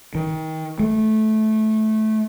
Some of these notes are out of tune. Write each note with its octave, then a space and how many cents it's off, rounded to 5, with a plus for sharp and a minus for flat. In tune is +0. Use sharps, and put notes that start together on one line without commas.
D#3 +30
A3 -15